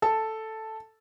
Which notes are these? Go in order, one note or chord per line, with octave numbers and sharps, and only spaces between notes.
A4 A5